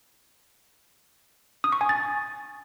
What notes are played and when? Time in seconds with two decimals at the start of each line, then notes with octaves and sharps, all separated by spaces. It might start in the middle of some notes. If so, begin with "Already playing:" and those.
1.64 D#6
1.72 C#6
1.81 G#5
1.89 A6